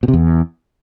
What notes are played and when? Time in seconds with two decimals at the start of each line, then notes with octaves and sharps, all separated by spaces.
0.03 B2
0.08 C3
0.13 E2